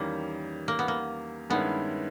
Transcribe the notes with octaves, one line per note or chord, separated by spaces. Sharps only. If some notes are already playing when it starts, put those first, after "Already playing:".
Already playing: E2 D#3 G3 A#3 C#4
A#3
B3
A#3
G2 D#3 G#3 B3 C#4 E4